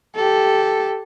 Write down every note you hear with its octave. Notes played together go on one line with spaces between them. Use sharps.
G4 A4